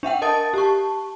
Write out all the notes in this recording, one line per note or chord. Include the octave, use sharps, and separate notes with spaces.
D4 E5 F#5 G5
A#4 D#5 A5 D#6 A6
G4 A5 C#6